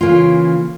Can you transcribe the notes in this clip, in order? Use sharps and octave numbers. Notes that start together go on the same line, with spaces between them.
C#3 E3 A#3 C#4 F4